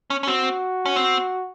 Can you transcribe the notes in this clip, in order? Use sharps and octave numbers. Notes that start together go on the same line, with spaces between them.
C#4
C#4
C4 F#4
C#4
C4